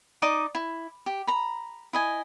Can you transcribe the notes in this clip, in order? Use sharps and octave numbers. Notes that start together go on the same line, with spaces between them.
D#4 D5 D#5 D6
E4
G4
A#5 B5
E4 D#5 G#5